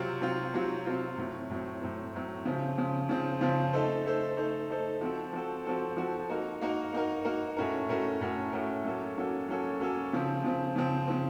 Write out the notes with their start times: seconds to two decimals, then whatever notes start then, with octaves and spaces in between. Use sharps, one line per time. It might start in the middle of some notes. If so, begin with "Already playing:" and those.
Already playing: C3 F#3 C4 F4
0.21 C3 F#3 C4 F4
0.54 C3 F#3 C4 F4
0.86 C3 F#3 C4 F4
1.17 A2 F#3 C4
1.50 A2 F#3 C4
1.82 A2 F#3 C4
2.14 A2 F#3 C4
2.45 C#3 F3 C4
2.78 C#3 F3 C4
3.09 C#3 F3 C4
3.41 C#3 F3 C4
3.73 A3 D#4 A4 C5
4.05 A3 D#4 A4 C5
4.37 A3 D#4 A4 C5
4.70 A3 D#4 A4 C5
5.01 F3 C4 F#4 A4
5.33 F3 C4 F#4 A4
5.65 F3 C4 F#4 A4
5.97 F3 C4 F#4 A4
6.30 A#3 D#4 F#4 A#4
6.61 A#3 D#4 F#4 A#4
6.93 A#3 D#4 F#4 A#4
7.25 A#3 D#4 F#4 A#4
7.57 A2 A3 C#4 F#4 A#4
7.89 A2 A3 C#4 F#4 A#4
8.21 A2 A3 C#4 F#4 A#4
8.53 A2 A3 C#4 F#4 A#4
8.84 F#3 A#3 C#4 F#4 A4
9.17 F#3 A#3 C#4 F#4 A4
9.48 F#3 A#3 C#4 F#4 A4
9.80 F#3 A#3 C#4 F#4 A4
10.13 C#3 F3 C4
10.44 C#3 F3 C4
10.76 C#3 F3 C4
11.08 C#3 F3 C4